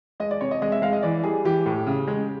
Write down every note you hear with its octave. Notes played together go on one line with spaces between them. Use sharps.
G#3 D#5
D5
C3 C#5
D#5
G#3 D#5
E5
G#3 F5
D#5
E3 D5
G3 G#4
E3 G4
A2
C#3
G#3